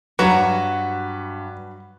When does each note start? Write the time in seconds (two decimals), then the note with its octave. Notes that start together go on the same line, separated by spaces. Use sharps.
0.19 G2 F#3 F#4 B4 A#5 F#6 E7